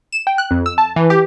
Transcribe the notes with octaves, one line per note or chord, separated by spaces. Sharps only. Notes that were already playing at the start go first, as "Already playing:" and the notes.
E7
G5
F#6
F2
E6
A5
E3
G4